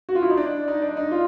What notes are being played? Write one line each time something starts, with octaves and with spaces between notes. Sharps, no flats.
F#4
F4
E4
D#4
D4
D#4
D4
D#4
F4